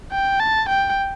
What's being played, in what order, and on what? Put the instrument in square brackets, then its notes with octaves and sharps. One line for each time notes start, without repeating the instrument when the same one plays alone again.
[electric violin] G5
A5
G5